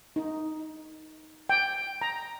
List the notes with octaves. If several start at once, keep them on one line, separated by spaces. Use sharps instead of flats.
D#4
G5
A#5